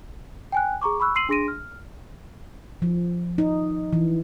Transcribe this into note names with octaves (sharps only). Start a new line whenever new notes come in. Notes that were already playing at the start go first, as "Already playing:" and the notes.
G5 G#5 F#6
G#4 A#5 C#6 D6
B5 C#6 E6 F#6
C6 E6 C7 D#7 F#7
D4 G#4 C6 A#6 D7 D#7
F6
F3
D#4
E3